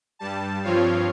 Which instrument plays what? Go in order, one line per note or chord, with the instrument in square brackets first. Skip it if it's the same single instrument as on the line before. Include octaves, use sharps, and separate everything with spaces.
[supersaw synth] G2 G3 A5
G2 F3 C4 F4 C#5 F5